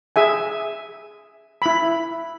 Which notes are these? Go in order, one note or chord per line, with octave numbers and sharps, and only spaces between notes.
G#4 E5 G#5
E4 B5